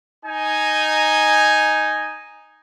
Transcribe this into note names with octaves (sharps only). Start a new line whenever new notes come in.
D#4 G#5